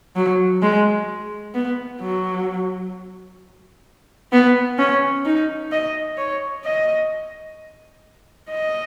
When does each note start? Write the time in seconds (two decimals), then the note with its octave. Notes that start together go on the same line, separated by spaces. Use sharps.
0.16 F#3
0.62 G#3
1.55 B3
2.01 F#3
4.32 B3
4.79 C#4
5.25 D#4
5.72 D#5
6.18 C#5
6.65 D#5
8.50 D#5